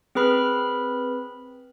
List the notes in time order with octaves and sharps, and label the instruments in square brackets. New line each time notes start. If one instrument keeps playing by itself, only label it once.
[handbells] C4 G#4 B4 B5 F6